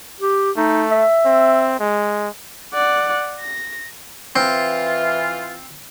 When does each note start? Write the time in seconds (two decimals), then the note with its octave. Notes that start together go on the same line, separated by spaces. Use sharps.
0.21 G4
0.57 A3 D#4
0.91 E5
1.26 C4
1.79 G#3
2.74 D5 F#5
3.40 A#6
4.36 E3 C4 F4